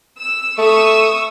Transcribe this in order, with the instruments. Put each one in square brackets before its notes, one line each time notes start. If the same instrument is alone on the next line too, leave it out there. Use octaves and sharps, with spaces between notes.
[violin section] E6
[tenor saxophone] A3 [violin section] C#6 D#6 E6